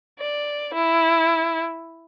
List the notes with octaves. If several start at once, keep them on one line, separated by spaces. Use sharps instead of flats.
D5
E4